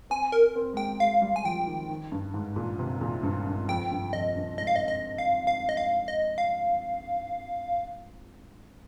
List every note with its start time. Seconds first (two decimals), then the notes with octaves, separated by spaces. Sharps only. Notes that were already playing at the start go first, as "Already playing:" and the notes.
0.10 C4 G#5
0.32 A#4
0.55 C4
0.73 G#3
0.77 A#3 G5
1.00 G#3 F5
1.22 G3
1.36 G#5
1.44 F3 G5
1.67 D#3
1.90 D#3
2.12 G2
2.34 G#2
2.56 A#2
2.79 C3
3.01 A#2
3.23 G2
3.47 G2
3.68 F2 G5
3.91 G2
4.13 F2 D#5
4.36 G2
4.58 G#2 D#5
4.67 F5
4.76 D#5
4.88 D#5
5.18 F5
5.47 F5
5.69 D#5
5.77 F5
6.08 D#5
6.38 F5